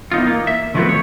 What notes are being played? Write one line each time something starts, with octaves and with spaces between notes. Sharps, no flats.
E2 D#4 F4
A#3
E5
D#3 F3 F#3 A3 B3 C4
C#5